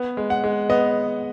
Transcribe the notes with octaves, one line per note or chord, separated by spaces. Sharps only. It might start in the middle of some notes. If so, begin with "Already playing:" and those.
Already playing: B3
G#3
F#5
G#3
B3 D#5